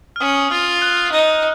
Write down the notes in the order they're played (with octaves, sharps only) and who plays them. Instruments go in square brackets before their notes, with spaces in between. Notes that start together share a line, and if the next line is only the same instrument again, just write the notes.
[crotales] F6
[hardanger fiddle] C#4 [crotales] D#6
[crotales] D#6
[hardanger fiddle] F4 [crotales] F6
[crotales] F#6
[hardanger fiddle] D#4